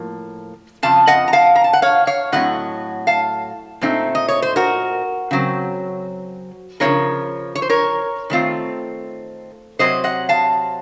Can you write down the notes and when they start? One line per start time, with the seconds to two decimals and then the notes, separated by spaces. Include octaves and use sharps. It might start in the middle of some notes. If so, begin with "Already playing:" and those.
Already playing: A2 F3 A#3
0.83 F2 C#3 F3 F5 A5
1.07 D#5 F#5
1.28 A#5
1.33 F5 A5
1.56 A#5
1.64 A5
1.73 F#5
1.82 C#5 F5
2.07 C#5 F5
2.32 A2 F#3 C4 D#5 F#5
3.07 F5 A5
3.82 A#2 A3 C4 D#4
4.15 D#5
4.28 C#5
4.42 C5
4.56 F#4 A#4
5.31 C#3 F#3 C4
6.80 C#3 F3 C4 F4 A#4 C#5
7.56 C#5
7.62 C5
7.70 A#4 C#5
8.30 D#3 A3 C4 F4
9.79 C3 F#3 C4 C5 D#5
10.04 D#5 F#5
10.29 F5 A5